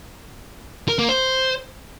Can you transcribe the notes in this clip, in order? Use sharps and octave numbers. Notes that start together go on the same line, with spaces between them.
A#4
A#3
C5